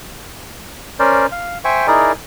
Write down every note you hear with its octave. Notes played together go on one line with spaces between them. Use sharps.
C#4 A#4 C5 D5
F5
C5 E5 G5 G#5 C#6
D#4 E4 G#4 A#4 D5